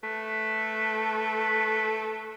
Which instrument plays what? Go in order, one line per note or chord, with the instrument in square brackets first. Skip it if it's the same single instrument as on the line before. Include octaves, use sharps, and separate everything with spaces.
[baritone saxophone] A3 [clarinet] B4